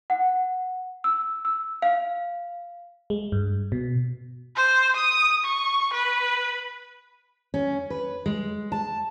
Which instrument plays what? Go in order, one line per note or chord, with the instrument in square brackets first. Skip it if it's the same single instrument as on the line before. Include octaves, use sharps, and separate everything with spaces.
[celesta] F#5
E6
E6
F5
[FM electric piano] G#3
G2
B2
[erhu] C5
D#6
C#6
B4
[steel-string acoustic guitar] C#4
B4
G#3
A5